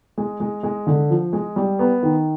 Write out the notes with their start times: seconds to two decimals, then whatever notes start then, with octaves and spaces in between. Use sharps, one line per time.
0.18 G#3
0.40 G#3
0.63 G#3
0.87 D3
1.10 F3
1.33 G#3
1.56 G3
1.79 B3
2.03 D#3